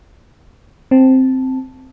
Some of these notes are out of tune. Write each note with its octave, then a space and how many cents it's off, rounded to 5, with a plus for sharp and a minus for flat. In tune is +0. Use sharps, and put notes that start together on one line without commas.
C4 +0 A5 +0